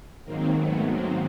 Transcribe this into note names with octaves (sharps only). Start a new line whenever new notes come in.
G#2 D#3 F#3 A#3 C4
A3 B3
A#3 C4